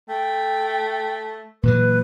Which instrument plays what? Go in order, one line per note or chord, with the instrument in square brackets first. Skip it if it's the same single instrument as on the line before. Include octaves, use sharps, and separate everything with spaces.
[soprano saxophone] A3 [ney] G5
[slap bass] A#2 E3 F#3 [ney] B4